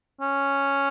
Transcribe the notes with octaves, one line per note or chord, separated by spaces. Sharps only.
C#4